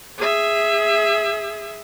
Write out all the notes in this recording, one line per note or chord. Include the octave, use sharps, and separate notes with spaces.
G#4 E5